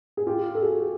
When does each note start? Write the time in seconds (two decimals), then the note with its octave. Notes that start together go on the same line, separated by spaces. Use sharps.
0.17 G#4
0.27 F4 G4
0.55 A4
0.61 F#4 G#4